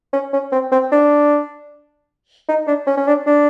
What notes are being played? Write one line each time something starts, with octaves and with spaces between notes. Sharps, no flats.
C#4
C#4
C4
C4
D4
D#4
D4
C#4
C#4
D4
D4